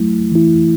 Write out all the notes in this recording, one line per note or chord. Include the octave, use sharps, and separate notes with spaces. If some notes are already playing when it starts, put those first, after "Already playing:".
Already playing: F#3 A3 E4
E3 A3 E4